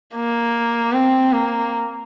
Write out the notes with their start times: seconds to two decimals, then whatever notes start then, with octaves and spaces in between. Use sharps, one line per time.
0.16 A#3
0.93 C4
1.32 A#3